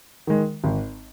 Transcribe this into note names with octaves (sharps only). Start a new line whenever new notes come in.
D#3 G#3
G#1